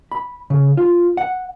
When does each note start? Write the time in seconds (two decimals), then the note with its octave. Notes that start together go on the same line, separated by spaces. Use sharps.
0.12 B5
0.50 C#3
0.77 F4
1.17 F#5